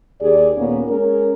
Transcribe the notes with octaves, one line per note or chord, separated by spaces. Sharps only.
D#2 G4 G#4 D5
D#2 A#2 A#3 B3 C#4
G#3 C#4 G#4 A#4